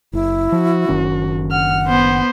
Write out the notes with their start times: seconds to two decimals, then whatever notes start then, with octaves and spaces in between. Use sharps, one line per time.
0.13 F#1 E4
0.52 F3 F#4
0.89 F#1 D#3 C#4
1.51 F#5 F6
1.87 B3 C5